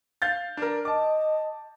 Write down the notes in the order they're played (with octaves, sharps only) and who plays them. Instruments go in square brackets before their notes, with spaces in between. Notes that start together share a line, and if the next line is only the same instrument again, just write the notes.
[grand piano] F5 G6 A6
D4 A#4
[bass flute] D#5 [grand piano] A5 D6